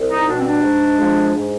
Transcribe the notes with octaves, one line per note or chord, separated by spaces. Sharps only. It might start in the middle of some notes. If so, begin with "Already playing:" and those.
Already playing: C2
D#4
B2 G3 D4
C4
D4
G#2
F3 G#3
G#2